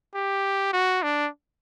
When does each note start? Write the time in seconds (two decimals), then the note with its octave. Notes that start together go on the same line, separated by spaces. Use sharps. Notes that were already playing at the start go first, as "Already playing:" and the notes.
0.15 G4
0.73 F#4
1.03 D4